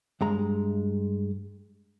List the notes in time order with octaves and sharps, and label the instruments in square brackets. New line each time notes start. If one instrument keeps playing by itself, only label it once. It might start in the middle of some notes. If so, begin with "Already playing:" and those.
[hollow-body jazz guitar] G2 G#3 A#5